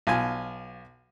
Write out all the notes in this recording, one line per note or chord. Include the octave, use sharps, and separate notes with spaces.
B1 F4 G#5